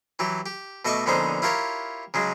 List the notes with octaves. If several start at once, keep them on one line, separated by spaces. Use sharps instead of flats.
E3 F#3 G4
G4
B2 A3 D#5 E5 C#6 D6
A#1 D3 B3 C#4 D#4 C5
E4 F4 G4 A#4 C#5
C#3 F#3 G#3